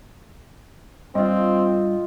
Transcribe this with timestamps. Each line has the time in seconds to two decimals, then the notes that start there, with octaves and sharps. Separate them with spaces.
1.15 G2 C4 F4 D#5